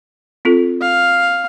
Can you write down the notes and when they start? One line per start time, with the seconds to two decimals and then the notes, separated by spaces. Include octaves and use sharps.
0.45 C4 F4 A4
0.81 F5